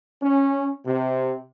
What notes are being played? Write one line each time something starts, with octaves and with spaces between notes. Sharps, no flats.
C#4
C3